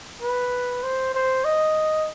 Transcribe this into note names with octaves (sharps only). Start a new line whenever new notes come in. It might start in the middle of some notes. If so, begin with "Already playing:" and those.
B4
C5
C5
D#5